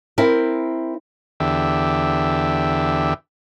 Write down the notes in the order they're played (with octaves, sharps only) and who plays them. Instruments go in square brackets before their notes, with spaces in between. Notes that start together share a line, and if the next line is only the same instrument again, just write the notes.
[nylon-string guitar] C4 E4 A#4
[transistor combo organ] E2 D3 G4 E5